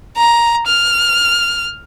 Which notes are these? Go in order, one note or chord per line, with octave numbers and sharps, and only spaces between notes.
A#5
F6